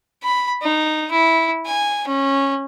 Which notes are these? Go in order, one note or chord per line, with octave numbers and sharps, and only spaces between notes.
B5
D#4
E4
G#5
C#4